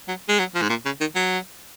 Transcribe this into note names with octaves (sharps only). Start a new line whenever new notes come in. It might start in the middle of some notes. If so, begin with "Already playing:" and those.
F#3
G#3
F#3
F3
G#2
A#2
C#3
D#3
F#3